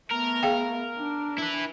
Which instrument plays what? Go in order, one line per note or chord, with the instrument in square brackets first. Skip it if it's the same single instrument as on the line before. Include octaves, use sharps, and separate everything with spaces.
[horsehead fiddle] A3 B3 [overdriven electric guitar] A#4
[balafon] G#4 F5 G5
[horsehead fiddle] D4
[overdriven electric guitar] E4 B4